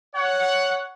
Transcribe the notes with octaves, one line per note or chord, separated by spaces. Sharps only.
C#5 F#5